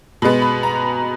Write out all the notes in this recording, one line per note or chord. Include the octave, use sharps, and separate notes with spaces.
B2 G#3 B3
B5
A#5